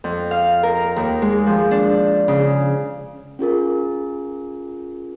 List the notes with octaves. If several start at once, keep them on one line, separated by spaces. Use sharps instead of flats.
F2
F5
A#4
D#2
G#3
F3
D4
C#3
C#4 F4 G#4 A#4